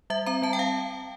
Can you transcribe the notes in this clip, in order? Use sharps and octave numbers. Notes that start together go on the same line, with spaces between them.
G3 E5
C4 A#5
G3 A5
G5
C4 F5